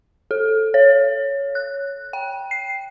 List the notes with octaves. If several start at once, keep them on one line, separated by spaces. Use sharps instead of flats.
A4
C#5
F#6
G5
C7